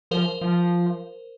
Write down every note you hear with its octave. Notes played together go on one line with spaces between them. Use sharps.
F3 A#4 C5
F3